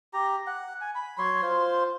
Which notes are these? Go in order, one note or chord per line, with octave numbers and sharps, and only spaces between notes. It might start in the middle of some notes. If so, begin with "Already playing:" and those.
G4 A#5
F#5
G#5
B5
F#3 C#5 C6
F4 C5